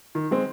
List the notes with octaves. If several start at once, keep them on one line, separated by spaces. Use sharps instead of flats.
D#3
G#3 C4